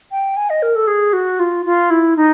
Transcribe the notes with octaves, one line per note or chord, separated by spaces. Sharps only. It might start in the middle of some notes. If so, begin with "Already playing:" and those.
G5
G#5
D#5
A#4
A4
G#4
F#4
F4
F4
E4
D#4